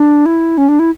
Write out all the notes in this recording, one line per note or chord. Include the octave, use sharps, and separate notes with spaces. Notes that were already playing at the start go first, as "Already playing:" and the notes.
Already playing: D4
E4
C#4
D4
E4